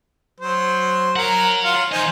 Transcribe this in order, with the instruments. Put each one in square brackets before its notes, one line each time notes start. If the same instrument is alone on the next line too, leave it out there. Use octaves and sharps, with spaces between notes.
[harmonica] F#3 C5
[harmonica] A#4 [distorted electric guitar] C#5 F#5
[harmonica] F4 F5
[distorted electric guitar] E3 D#5 [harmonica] D#4 C5 G#5